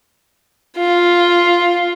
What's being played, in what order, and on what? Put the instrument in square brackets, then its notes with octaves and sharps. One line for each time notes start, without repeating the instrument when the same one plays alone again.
[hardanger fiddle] F4